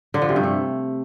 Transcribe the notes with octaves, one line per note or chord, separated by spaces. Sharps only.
D3
F3
C3
G2
A3